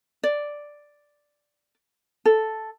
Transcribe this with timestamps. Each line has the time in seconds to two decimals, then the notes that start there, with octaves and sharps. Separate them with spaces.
0.24 D5
2.26 A4